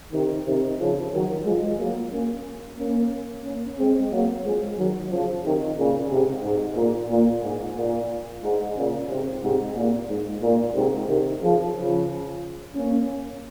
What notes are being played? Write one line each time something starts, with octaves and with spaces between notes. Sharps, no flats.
C3 D#3
C3 D#3
C#3 F3
D#3 F#3
F3 G#3
F#3 A#3
A#3 C#4
A#3 C#4
A#3 C#4
G#3 C4
F#3 A#3
F3 G#3
D#3 F#3
C#3 F3
C3 D#3
A#2 C#3
G#2 C3
G#2
A#2
A#2
G#2
A#2
G#2
A#2 C#3
G#2 C3
G#2 C3
A#2
G#2
A#2
G#2 C3
C3 D#3
C#3 F3
C#3 F3
A#3 C#4